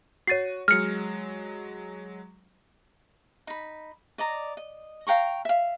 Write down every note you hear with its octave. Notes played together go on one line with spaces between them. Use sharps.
F#4 C#5 A6 C7 D#7
F#3 G#3 F6 C#7
D#4 B5
D5 D#5 A#5
D#5
F5 G5 A#5 C#6
E5 F5